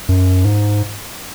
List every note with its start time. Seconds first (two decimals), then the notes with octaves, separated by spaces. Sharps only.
0.09 F#2
0.45 G#2